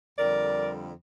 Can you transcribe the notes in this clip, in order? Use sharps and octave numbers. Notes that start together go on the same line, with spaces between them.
F2 D3 G3 A#4 D5